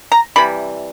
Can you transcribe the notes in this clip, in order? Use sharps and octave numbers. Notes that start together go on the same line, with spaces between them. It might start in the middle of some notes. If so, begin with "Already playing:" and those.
A#5
C3 E3 G3 B5